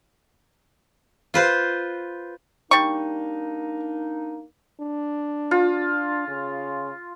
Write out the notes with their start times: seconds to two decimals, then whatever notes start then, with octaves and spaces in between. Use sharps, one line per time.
1.34 F4 B4 C5
2.71 G3 A#3 D4 D#4 C#6
4.80 D4
5.51 F4
6.28 C#3